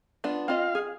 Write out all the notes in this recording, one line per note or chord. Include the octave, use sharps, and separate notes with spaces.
B3 D4 F4
C4 F4 D#5 F5
G#4